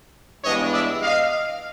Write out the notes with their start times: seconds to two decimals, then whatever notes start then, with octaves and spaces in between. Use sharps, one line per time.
0.45 G2 E3 G#3 B3 D4 C#5 D#5
0.73 D5 E5
1.01 D#5 F5